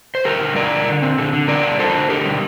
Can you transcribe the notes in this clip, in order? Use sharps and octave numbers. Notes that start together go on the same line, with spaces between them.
C5
G3 G4 A#4
D3
G3 A#4 D5
D3
D3
C4
D3
D3
G3 A#4 D5
D3
D3 A4 C5
D3
D3 G4 A#4
G3